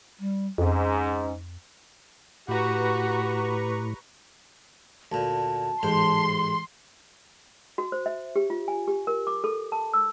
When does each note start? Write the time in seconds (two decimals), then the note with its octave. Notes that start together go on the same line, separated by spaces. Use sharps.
0.19 G3
0.58 F2 G#2 C#4
2.48 A2 F#4 G4 B4 A#5 C#6
5.12 D2 A#2 A5
5.83 A1 G#2 C5 C6
7.78 F#4
7.92 C5
8.06 E5
8.36 G4
8.50 F4
8.68 G#5
8.88 G4
9.07 A#4
9.27 D6
9.44 A4
9.72 A5
9.94 E6